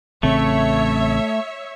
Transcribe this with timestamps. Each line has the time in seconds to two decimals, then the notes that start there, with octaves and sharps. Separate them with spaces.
0.23 A1 C#3 A3 C4 C#5 E5